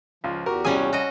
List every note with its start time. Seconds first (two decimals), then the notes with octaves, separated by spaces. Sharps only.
0.24 C#2 F3 F4
0.46 E2 F#4 G4 A#4
0.65 C2 G3 C#4 G#4 G#5
0.93 F#4 D#5